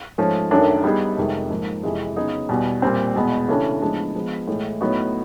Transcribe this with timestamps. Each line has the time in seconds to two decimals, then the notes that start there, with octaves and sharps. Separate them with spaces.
0.18 G#2 F3 A3 C#4
0.51 F#2 D#3 F#3 A3 D4
0.84 G3 B3 D#4 G#4
1.17 F2 C3 D#3 G#3
1.50 G#2 F3 A#3
1.83 F2 C3 E3 G#3
2.16 C#3 F#3 B3 D#4 G#4
2.49 E2 B2 G3
2.82 A#2 G3 C4
3.15 E2 B2 G#3 B3
3.48 C#3 E3 A3 D4 G4
3.82 A2 F3 G#3 B3 D4
4.15 F3 G#3 B3
4.48 A2 E3 G#3
4.81 A2 F#3 B3 D#4 F#4